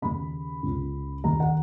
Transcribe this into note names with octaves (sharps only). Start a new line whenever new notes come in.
D#2 C#3 B5
C#2 C#3
D#2 D#3 A#5
F#5